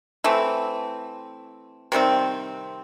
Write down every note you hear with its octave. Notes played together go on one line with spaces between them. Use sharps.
E3 A3 C4
C3 D#3 G3 C4